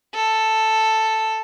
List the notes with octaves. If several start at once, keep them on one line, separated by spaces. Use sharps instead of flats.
A4